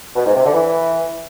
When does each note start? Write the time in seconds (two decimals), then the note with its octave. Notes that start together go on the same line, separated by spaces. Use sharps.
0.16 B2
0.25 G#2
0.35 C3
0.44 D3
0.54 E3